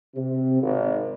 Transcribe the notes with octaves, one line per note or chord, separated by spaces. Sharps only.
C3
G#1